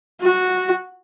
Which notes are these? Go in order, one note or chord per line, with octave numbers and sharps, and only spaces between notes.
F#4